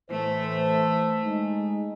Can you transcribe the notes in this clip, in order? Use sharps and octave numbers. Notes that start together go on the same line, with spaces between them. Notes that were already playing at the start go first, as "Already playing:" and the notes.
A2 E3 A3 C5
G#3 D#4